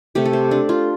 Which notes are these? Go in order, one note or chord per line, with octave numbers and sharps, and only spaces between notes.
C3 A3 G4
A4
C5
D4
F4